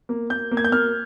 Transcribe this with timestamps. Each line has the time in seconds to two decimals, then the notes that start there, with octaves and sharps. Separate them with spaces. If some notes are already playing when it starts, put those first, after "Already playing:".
0.09 A#3
0.30 A#3 G6
0.51 A#3
0.57 G#6
0.65 G6
0.72 A#3 F6